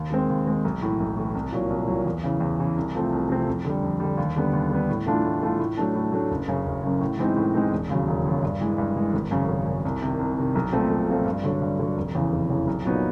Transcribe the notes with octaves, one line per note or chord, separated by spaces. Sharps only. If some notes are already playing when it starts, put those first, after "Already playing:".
Already playing: D#2
D#3 G#3 C4
D#2
D#3 G#3 C4
B1
A2 E3
B1
A2 E3
C2
A#2 F#3
C2
A#2 F#3
E2
C#3 E3
E2
C#3 E3
C2
C3 F3 A3 C4
C2
C3 F3 A3 C4
F2
D3 G3
F2
D3 G3
D#2
D3 G3 B3
D#2
D3 G3 B3
A2
E3 A3 D4 F4
A2
E3 A3 D4 F4
A2
F#3 A3 D4
A2
F#3 A3 D4
F#1
F#2 C#3
F#1
F#2 C#3
A2
E3 G#3 C4 D#4
A2
E3 G#3 C4 D#4
E1
D#2 C#3 F#3
E1
D#2 C#3 F#3
G2
E3 G#3
G2
E3 G#3
G#1
F#2 C#3
G#1
F#2 C#3
C2
C3 D#3
C2
C3 D#3
B1
A#2 F3 A3 C4
B1
A#2 F3 A3 C4
G2
D3 F#3
G2
D3 F#3
F1
E2 C#3 E3
F1
E2 C#3 E3
B1
A#2 F#3 B3 D#4